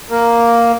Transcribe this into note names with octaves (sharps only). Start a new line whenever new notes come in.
A#3